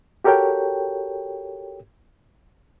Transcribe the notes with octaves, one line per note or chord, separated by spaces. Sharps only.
F#4 G4 A4 A#4 C#5 G5